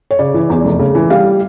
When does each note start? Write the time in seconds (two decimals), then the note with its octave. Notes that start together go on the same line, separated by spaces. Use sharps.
0.11 C#5
0.19 C#3 D5
0.34 E3
0.50 E2
0.65 F1
0.79 C#3
0.95 E3
1.10 G3 F5